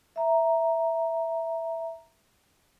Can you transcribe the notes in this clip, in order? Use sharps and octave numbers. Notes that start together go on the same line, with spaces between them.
E5 A#5